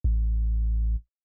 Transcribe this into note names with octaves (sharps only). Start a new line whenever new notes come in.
A1